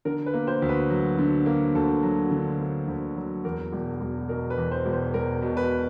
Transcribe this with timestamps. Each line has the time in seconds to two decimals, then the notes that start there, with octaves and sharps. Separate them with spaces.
0.05 D3 A#4
0.26 B4
0.34 A#3
0.47 C5
0.62 D2
0.69 B4
0.90 F#3
1.18 D3
1.46 A#3
1.75 D2 A4
2.03 F#3
2.31 D3
2.60 A#3
2.88 D2
3.17 F#3
3.44 E2 A#4
3.72 E1
4.01 E1
4.29 B2 A#4
4.50 B4
4.57 E2
4.71 C5
4.86 E1
4.93 C5
5.14 E1 A#4
5.42 B2
5.57 B4